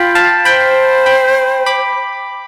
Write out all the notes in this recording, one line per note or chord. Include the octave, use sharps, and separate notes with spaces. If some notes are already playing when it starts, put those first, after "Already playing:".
Already playing: F4 G5 B5
F5 A5
C5 G5 B5
G5 B5
B5 D6